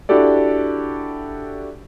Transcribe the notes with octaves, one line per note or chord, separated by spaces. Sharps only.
D4 E4 F#4 G4 A4 D5